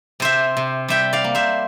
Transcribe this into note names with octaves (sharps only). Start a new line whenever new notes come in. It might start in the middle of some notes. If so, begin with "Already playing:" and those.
C3 C5 E5
C3
G3 E5 G5
D5 F5
A#3
C5 E5